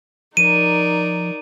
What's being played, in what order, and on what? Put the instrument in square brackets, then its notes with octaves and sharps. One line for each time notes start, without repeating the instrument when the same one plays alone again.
[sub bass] F3 [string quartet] D#4 A#4 D5 [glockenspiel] D#7